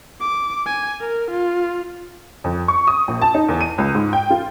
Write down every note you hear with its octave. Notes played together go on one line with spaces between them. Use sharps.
D6
G#5
A#4
F4
F2
C#6
D#6
A#1
A5
D#4
E2
D#7
C#2
G#2
G5
F4